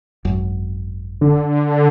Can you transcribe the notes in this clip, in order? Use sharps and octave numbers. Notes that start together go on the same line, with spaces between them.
G#1 F#2
D3